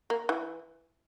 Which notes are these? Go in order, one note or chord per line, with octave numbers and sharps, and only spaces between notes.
A#3
E3